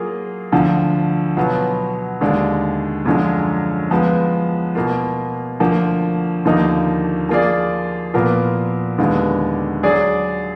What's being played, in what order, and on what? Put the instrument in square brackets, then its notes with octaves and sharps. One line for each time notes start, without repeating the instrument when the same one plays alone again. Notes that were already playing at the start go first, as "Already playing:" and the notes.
Already playing: [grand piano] F#3 A#3 F4 G#4
D2 D3 F3
B2 F#3 B3 F4
D#2 D3 G#3 D4
F#2 D3 F3 G#3
F3 G#3 B3
B2 A#3 F4
D2 D3 F3 A#3
D#2 D3 F3 A#3 D#4
F3 A#3 F4 G#4 D5
A#2 F3 B3 F4 A#4
D#2 D3 G#3 B3
F#3 D4 G#4 D5